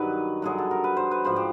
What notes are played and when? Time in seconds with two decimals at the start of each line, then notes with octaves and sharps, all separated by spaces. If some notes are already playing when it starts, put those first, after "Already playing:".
Already playing: G2 D#3 F#3 B4
0.42 G2 D3 F#3 G#4
0.58 A4
0.71 A#4
0.84 B4
0.97 C5
1.11 B4
1.24 G#2 F3 C5
1.36 G4